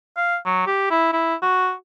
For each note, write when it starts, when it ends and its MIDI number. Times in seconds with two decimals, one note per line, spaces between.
0.17 0.36 77
0.46 0.66 54
0.67 0.86 67
0.91 1.08 64
1.13 1.35 64
1.42 1.73 66